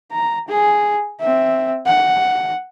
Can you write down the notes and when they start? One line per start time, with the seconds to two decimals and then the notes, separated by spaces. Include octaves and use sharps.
0.12 A#5
0.48 G#4
1.20 C4 E5
1.86 F#5